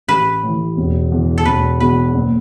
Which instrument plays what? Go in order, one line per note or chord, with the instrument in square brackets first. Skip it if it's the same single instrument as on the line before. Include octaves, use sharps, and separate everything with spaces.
[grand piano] A1 [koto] B4
[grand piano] A2 E3
E1
E2 E3
[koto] A4
[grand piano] E1 [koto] B4
[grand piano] E2 B2 [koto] B4
[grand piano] F#1